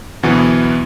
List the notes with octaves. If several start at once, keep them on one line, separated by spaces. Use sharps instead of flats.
D2 B2 E3 F#3 B3